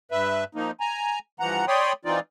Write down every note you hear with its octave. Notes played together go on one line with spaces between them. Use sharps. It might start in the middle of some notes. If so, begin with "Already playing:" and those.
G2 B4 E5
F3 A#3 D#4
G#5 A#5
G2 E3 F3 F#5 A#5
C#5 D5 G5 B5 C6 D#6
E3 C4 D#4 F4 D5